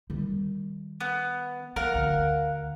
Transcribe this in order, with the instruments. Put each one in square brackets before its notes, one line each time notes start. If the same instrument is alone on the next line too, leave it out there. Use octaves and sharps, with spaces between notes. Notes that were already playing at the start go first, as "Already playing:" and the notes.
[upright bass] D#3 G3
[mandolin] B3
[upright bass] B3 [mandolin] A#4 F5 F#5
[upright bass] D2